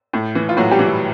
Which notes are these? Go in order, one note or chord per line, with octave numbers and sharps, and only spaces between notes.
A2
E3
F4
A2 F#3 F#4
G3 G4
E3
E4